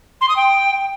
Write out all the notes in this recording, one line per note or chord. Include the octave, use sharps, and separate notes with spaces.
C6
D#6
G5